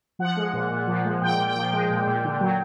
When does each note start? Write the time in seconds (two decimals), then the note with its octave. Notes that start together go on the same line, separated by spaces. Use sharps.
0.19 F3 F#5
0.37 G#3
0.53 A#2
0.71 A#2
0.87 F3
1.05 G#3
1.21 A#2 G5
1.39 A#2
1.47 G5
1.56 F3
1.73 G#3
1.90 A#2
2.07 A#2
2.24 D3
2.40 F#3